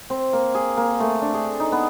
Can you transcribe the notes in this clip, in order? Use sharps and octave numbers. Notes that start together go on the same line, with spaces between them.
C4
A#3
G#4
A#3
A3
D4
G#4
D#4
B3